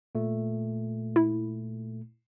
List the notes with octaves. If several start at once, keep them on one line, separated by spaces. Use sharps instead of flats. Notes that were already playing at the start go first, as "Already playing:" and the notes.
A#2 A3
E4